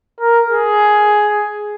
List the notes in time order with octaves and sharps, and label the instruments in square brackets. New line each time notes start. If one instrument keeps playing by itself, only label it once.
[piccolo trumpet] A#4
G#4